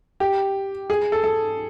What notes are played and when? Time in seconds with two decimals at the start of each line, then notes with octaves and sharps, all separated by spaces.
0.20 G4
0.90 G#4
1.12 A4
1.24 A4